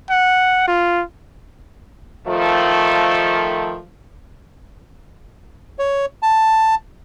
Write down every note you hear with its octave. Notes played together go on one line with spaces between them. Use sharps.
F#5
F4
D#3 F3 A3
C#5
A5